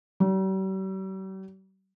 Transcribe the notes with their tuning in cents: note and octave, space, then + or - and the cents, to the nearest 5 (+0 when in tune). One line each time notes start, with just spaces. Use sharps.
G3 -45